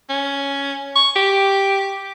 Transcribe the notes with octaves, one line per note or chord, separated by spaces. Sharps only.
C#4
C#6
G4